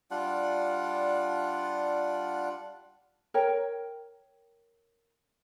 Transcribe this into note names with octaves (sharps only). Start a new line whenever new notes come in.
G3 D4 F4 F#5
A#4 C#5 G5